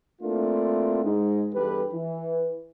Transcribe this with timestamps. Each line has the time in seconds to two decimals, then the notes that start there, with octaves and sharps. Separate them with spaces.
0.22 A3 A#3 C4 D4 E4 F4
1.04 G#2 G#3 D#4
1.53 E2 G2 G4 A4 B4
1.92 E3